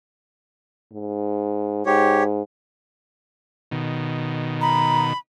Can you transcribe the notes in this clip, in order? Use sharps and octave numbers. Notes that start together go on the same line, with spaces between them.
G#2
G#2 G4 C#5
B2 D#3
A#5 B5